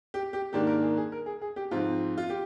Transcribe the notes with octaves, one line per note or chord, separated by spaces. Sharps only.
G4
G4
G#2 D#3 A#3 D4 G4
A#4
G#4
G#4
A#4
G#4
G#4
G4
G#2 F3 C4 F4
F4
G4